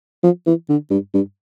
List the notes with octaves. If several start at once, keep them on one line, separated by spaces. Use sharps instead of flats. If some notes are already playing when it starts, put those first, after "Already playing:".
F3
E3
D3
G2
G2